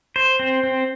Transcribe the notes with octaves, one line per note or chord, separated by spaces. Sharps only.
C5
C4
C4